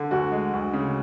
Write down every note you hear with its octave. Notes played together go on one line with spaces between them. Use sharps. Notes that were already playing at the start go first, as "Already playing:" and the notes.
Already playing: D3
D2 F#4
G#3
D2
C#3